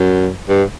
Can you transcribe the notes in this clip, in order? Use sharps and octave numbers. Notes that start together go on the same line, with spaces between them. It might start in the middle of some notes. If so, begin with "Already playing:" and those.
Already playing: F#2
G2